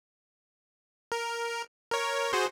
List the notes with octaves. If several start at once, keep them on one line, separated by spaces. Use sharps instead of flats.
A#4
A#4 C#5
F#4 G#4 C5